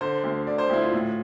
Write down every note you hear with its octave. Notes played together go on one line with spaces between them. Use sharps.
D3 C5
D2
D3 D5
C5
D2 E4
F4
A2